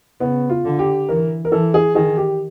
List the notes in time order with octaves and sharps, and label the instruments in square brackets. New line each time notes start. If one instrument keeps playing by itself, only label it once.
[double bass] C#3 [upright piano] B3
[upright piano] F4
[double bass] D3
[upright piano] G4
[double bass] E3 [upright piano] A#4
[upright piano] A#4
[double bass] E3 [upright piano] A4
[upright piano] G#4
[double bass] D#3 [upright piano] G#4
[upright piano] G4